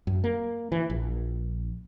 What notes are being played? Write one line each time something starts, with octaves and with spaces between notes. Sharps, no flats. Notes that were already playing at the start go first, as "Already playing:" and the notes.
F#2
A#3
E3
A#1